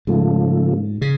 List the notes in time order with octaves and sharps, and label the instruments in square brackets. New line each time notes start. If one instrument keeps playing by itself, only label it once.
[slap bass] G#2 [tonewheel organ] C#3 F3 A3
[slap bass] C#3